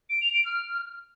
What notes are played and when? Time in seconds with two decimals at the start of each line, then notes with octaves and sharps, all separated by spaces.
0.09 D7
0.21 F7
0.33 D7
0.45 F6